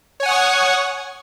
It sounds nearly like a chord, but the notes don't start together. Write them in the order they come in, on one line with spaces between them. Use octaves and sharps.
C#5 G#5 F#5 D#6 C#6